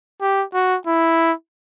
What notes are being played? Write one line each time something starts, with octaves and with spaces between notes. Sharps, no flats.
G4
F#4
E4